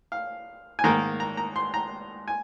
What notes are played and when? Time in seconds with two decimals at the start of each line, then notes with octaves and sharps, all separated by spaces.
0.12 F5
0.79 G#5
0.84 G#2 D#3 A#3 A#5
1.20 A#5
1.37 A#5
1.56 C6
1.74 A#5
2.28 G#5